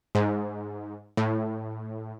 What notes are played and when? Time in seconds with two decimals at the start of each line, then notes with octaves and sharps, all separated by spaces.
0.15 G#2
1.17 A2